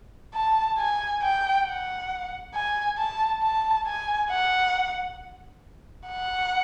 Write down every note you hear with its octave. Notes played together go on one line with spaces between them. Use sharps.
A5
G#5
G5
F#5
G#5
A5
A5
G#5
F#5
F#5